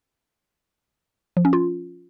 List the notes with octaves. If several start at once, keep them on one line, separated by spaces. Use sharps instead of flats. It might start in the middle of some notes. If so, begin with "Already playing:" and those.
F3
C#4
F4